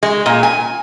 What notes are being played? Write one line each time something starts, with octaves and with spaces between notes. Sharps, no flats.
G#3
A#2
G#5